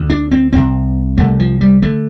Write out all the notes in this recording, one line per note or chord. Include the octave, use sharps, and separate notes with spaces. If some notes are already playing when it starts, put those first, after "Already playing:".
Already playing: D2 D3
D4
C4
C2 C3 C4
C2 C3 A3
F3
G3
D3 A3